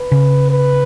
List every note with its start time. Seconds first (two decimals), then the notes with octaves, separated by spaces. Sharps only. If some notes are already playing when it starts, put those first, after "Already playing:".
Already playing: B4
0.12 C#3
0.51 B4